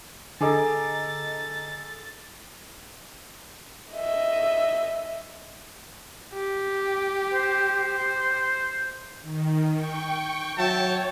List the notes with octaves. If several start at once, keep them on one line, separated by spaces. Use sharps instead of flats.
D3 G#4 A4 D#5 A#5 D6 A6
D#5 E5
G4
C5
D#3
G5 C#6
F#3 C#5 E5 G5 A5